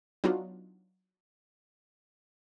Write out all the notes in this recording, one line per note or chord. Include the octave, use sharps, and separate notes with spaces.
F#3 B3 D4 D#4 F4 F#4